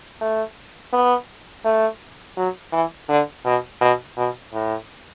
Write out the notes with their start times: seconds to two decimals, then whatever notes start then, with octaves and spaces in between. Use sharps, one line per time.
0.21 A3
0.92 B3
1.65 A3
2.37 F#3
2.72 E3
3.09 D3
3.45 B2
3.81 B2
4.17 B2
4.53 A2